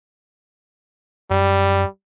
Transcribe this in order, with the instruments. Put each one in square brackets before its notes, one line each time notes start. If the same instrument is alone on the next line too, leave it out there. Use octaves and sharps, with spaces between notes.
[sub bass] F#2 [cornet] G3